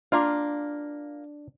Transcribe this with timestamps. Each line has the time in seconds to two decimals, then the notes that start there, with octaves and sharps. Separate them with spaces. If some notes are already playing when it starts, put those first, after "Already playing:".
0.12 A#3 D4 F4 F5